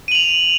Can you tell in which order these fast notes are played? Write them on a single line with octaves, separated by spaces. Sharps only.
D#7 F#7 F7